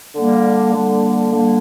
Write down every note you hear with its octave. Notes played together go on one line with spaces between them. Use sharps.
D3 G3 A#3
D3 G3 A#3
D3 G3 A#3